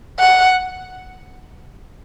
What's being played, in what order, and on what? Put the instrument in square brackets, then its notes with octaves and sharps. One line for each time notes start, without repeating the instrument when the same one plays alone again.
[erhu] F#5